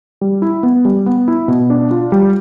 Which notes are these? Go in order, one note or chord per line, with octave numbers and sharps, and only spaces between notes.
G3
E4
B3
G3
B3
E4
B2
D4
F4
G3